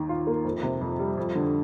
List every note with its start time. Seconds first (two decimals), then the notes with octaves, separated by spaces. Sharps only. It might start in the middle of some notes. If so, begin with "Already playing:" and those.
Already playing: D#2 D#3
0.09 F4
0.27 A#3
0.45 F2
0.63 C3
0.81 F2
0.99 G3
1.17 F2
1.35 D3